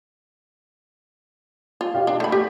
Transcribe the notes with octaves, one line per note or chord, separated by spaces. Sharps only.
F4
D#4 G4 F5
D4
A3 B5
G4 B6